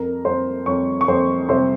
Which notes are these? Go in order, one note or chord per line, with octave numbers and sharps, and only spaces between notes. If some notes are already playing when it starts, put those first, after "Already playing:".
Already playing: F2 A#4 A#5
F2 C5 C6
F2 C#5 C#6
C#6
F2 C5 C6
C3 C5 C6